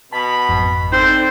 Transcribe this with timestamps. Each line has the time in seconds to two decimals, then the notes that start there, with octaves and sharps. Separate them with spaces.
0.13 B2 A5 B5
0.49 G#1 F2
0.92 C4 D#4 A4 C5 D5 E6